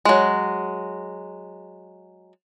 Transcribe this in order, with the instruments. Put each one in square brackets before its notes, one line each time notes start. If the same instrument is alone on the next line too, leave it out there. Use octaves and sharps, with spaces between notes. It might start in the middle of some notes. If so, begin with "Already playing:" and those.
[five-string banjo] F#3 G#3